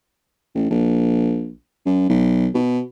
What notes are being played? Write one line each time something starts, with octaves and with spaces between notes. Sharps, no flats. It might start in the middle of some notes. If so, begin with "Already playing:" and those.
A1
A#1
F#2
B1
B2